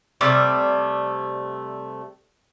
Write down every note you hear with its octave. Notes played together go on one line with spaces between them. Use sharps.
C3 G3 A3 D5